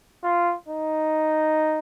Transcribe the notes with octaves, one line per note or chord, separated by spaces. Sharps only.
F4
D#4